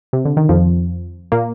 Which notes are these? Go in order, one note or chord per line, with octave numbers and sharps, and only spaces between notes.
C3
D3
D#3
F2 F3
A#2 A#3